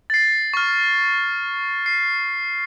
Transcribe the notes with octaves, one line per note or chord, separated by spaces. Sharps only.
A6 C7
C#6 F6
C7